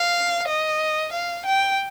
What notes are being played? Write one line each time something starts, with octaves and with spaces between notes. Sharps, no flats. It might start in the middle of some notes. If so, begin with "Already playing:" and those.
Already playing: F5
D#5
F5
G5